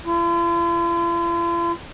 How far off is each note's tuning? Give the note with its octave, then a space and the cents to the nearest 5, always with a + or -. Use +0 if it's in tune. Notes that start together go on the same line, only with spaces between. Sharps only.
F4 -45